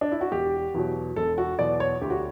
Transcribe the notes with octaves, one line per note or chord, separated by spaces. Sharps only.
D4
E4
F#4
E1 G4
E2 B2 F#3
E1 A4
F#4
E2 B2 F#3 D5
C#5
D2 G4
F#4